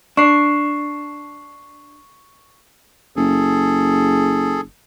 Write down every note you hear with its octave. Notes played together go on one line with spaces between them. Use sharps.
D4 C#6 C7
F#1 G#4 A4